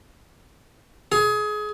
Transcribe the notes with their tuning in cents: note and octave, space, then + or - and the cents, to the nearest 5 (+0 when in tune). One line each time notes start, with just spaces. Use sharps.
G#4 +25